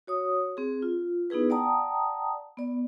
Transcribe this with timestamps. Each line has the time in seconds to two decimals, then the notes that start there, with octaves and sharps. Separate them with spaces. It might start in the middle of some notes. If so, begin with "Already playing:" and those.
0.07 F#4 C#5 D#6
0.57 C4 G#4
0.82 F4
1.30 B3 D#4 E4 G#4 B4
1.50 D5 F#5 G5 A5 A#5 D#6
2.57 B3 D5